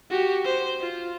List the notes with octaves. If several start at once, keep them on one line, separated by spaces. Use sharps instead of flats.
F#4 G4
C5
F4